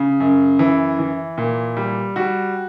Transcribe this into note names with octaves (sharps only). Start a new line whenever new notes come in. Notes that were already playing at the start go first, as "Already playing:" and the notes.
Already playing: C#3
F#2
E3
E3
A#2
G3
G3 F#4